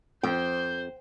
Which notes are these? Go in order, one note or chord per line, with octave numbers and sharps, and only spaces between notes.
F2 C5 G5 G6